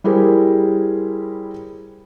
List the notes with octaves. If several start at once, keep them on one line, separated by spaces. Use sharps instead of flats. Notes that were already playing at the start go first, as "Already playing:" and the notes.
G3 E4 G4 G#4 A#4 C5